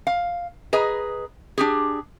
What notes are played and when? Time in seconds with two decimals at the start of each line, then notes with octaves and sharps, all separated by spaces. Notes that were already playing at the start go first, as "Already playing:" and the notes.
0.07 F5
0.73 G#4 B4 D#5 A#5
1.58 D4 G4 G#4